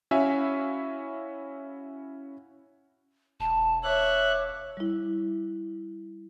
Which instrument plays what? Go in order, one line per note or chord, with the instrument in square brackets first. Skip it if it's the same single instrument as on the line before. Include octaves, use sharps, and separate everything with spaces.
[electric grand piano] C#4 E4 F#4 E5 F5 G#5
[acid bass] E1 [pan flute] A5
[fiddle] C#5 [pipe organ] E5 F#6 [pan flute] D6
[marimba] G3 E4